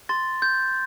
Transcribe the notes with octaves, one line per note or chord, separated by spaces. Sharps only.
C6 A6
G6